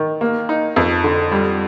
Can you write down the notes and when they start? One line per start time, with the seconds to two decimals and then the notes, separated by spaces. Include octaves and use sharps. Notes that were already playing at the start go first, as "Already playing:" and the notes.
Already playing: D#3
0.21 A#3
0.49 D#4
0.76 F2
1.04 D3
1.32 G3